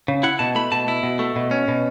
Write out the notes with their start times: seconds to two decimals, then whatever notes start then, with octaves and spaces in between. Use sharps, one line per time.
0.08 C#3
0.23 E4 F#5
0.39 B2 A5
0.55 A3 B5
0.72 B2 A5
0.88 E4
1.03 B2
1.19 A3
1.36 B2
1.51 C#4
1.68 B2